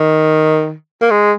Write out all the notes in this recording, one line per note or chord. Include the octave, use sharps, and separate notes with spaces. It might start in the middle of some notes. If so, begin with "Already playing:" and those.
Already playing: D#3
A#3
G#3